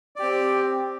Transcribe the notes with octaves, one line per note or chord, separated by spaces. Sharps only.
C4 G4 D5